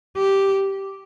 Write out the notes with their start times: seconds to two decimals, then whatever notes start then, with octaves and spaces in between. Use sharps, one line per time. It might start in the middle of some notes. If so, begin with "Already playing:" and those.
0.17 G4